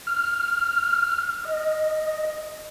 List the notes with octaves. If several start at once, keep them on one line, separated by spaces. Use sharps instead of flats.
F6
D#5